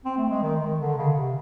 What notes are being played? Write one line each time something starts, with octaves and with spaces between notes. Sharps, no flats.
C4
A3
G#3
D#3
D#3
D3
C#3
C3